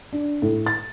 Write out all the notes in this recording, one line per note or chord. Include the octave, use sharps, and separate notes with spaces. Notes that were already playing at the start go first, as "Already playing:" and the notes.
D4
A2
A6